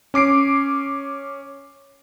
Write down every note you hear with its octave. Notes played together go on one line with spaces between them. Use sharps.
C#4 D6 C7 D7